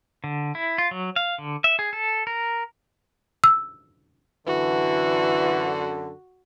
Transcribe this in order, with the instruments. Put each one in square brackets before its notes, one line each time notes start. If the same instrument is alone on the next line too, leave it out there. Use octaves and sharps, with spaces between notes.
[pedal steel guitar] D3
E4
F4
F#3
F5
D3
E5
G#4
A4
A#4
[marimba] E6
[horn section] F#2 D3 [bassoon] E3 [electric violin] F#4